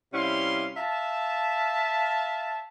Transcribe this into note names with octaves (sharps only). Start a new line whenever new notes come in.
C3 G3 C#4 E4 F5 C6
E5 F5 A5